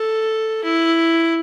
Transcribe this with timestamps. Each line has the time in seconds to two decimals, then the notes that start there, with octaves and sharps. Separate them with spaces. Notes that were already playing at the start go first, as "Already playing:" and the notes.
Already playing: A4
0.64 E4